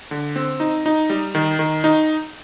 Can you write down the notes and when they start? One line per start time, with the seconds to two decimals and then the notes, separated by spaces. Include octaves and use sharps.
0.11 D3
0.36 C4
0.60 D#4
0.86 D#4
1.10 G3
1.35 D#3
1.59 D#3
1.84 D#4